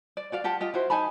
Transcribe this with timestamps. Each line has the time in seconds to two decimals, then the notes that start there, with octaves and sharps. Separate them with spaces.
0.17 D5
0.32 F#4 D5 F5
0.44 F4 G4 F#5 A5
0.60 F4 G4 D#5
0.74 E4 F#4 C5
0.90 D#4 G#5 A5 B5